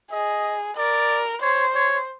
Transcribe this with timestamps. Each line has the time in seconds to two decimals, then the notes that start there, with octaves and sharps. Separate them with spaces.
0.11 G#4 D#5
0.77 A#4 D5
1.42 C5 C#5
1.75 C#5